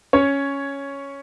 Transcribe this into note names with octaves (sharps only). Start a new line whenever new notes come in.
C#4 C#5